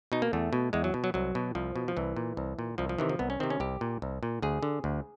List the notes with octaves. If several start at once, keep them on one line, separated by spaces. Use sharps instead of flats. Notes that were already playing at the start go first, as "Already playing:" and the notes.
B2 D#4
A#3
E2 A3
B2
E2 G#3
F#3
B2
F#3
C2 F#3
B2
C2 F3
B2
F3
C2 E3
A#2
C2
A#2
C2 F3
F3
C3 D#3 E3
F3
C2 B3
C#4
C3 D#3 C4
C#4
C2 G4
A#2
C2
A#2
D2 G#4
D3
D2